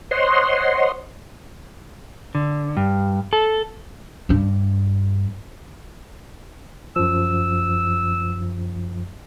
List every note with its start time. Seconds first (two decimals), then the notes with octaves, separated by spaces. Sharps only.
0.11 C5 C#5 D#5 F#5 C6
2.35 D3
2.77 G2
3.33 A4
4.29 G2 D4
6.96 F#2 F3 E6